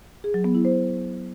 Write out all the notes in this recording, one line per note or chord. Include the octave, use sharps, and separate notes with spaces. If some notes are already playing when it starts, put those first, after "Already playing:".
G#4
F#3
B3
E4
C5